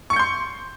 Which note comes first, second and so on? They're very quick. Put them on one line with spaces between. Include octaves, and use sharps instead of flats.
C#6 C#7 G6 C6